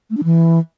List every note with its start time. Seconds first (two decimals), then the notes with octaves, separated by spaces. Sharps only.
0.10 A3
0.17 D4
0.24 E3